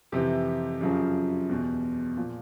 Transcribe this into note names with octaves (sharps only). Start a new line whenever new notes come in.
F2 C3 E3 G4
F#2 C#3 F3
E2 B2
A#2 F3